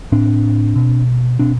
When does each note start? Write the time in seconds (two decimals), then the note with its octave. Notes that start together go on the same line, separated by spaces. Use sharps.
0.12 A2 C4 D4
0.76 B2
1.39 B2 C4 D4